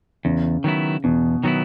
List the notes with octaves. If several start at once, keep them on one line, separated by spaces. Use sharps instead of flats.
E2 C#3
D#3 F#3 B3 E4
E2 B2
D#3 F#3 B3 E4